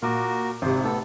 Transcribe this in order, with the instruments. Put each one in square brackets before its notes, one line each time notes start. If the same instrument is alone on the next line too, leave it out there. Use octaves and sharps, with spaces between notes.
[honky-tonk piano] A#2 D6 [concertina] F#4 A#4
[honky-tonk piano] G#1 C3 [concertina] C5
[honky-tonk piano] A2 [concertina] B3 A4